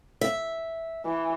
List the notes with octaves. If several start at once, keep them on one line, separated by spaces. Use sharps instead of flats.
E5
E3